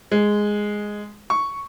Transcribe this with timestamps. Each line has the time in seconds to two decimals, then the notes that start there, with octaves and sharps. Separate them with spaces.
0.12 G#3
1.30 C#6